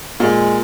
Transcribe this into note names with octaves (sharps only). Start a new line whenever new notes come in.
A#2 G#3